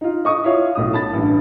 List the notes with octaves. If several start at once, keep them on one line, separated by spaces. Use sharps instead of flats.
D#4 F4
D#5 C#6 D#6
E4 F4 C#5 F5
B1 A2 D#6
A5 B5 A6
A1 G2